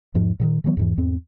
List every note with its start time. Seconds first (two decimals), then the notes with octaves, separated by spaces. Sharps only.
0.14 E2 G#2 F3
0.40 A#2 D3 D#3
0.64 D#3 E3 F#3 B3
0.77 E2 G#2 E3
0.97 E2 G#2 C4